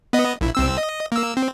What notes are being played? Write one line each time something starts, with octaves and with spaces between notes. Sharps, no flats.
B3 D#5
A#1 E4
C2 C4 E6
D#5
A#3 E6
C4